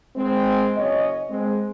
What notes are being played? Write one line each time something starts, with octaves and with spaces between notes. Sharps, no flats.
G#3 C4
F#1 C#4 C#5 D#5
G#3 C4